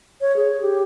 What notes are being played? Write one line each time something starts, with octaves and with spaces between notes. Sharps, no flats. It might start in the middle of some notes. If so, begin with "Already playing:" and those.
C#5
G#4
G4